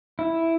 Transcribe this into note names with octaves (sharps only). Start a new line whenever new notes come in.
E4